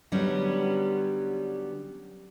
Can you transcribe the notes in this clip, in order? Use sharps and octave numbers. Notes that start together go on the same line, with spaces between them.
D3 F#3 G3 B3 C#4 G4